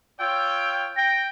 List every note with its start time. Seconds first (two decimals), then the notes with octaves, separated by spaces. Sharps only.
0.20 F4 C#5 G5 E6
0.96 G5 A#6